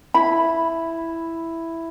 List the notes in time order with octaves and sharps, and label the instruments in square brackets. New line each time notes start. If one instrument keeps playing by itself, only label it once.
[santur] E4 [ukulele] B5